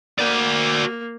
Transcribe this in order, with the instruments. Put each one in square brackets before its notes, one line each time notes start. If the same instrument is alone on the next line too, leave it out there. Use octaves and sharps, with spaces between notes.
[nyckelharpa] A#3 [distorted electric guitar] F#4 D5